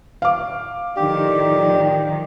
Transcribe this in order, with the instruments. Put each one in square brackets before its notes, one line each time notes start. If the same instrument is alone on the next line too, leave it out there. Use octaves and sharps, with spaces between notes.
[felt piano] F5 D6
[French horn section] A2 D5 [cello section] D#3 F3 [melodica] G4